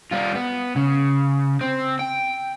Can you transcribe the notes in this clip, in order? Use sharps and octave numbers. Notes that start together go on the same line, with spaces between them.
G3 F4
B3
C#3
C4
G5